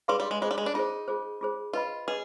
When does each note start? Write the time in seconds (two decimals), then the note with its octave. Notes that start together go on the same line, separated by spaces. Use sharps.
0.08 G3 G#4 B4 F5 C6
0.20 G3
0.31 G#3
0.41 G#3 F4 G#4 C5
0.51 G3
0.58 G#3
0.66 D4
0.74 D#4 F4 G#4 C5
1.08 F4 G#4 C5
1.41 F4 G#4 C5
1.73 F4 B4 D#5 B5
2.08 G#4 B4 D#5